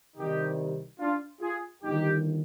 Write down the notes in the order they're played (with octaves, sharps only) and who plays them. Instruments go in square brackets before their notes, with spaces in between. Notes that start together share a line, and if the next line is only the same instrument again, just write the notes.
[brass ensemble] C2 C3 D#3 G3 D#4 G4
D4 F4
F4 G#4
G1 G2 D#3 D#4 G4